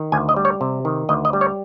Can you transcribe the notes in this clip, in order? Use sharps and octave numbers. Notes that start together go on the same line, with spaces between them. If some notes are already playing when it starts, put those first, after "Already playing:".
Already playing: D#3
D2 G#5
D#5
G3
C#5
C3
D#3
D2 D#5
D#5
G3
C#5